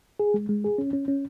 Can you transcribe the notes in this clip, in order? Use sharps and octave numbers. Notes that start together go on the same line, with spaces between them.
G#4
G#3
G#3
G#4
C#4
C#4
C#4